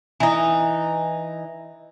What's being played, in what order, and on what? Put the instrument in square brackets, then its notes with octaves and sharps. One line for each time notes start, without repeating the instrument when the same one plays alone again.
[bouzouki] E3 D#4